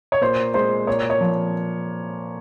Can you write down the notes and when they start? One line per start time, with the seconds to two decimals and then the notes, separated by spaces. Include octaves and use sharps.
0.12 C#5
0.21 A#2 C5
0.54 G#3 C5
0.87 A#2 C#5
1.10 C#5
1.21 F3